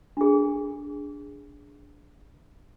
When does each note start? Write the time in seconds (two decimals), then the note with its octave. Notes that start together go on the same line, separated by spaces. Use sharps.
0.17 D4 G#4